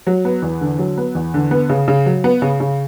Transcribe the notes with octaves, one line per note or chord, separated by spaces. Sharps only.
F#3
B3
E2
D3
F#3
B3
E2
D3
B3
C#3
C#3
F#3
B3
C#3
C#3